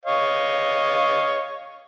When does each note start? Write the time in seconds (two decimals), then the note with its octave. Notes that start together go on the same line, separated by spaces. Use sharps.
0.05 C#5 D#5 F5